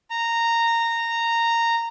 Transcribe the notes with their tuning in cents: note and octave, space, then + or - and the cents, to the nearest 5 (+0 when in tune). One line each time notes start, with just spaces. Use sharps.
A#5 -10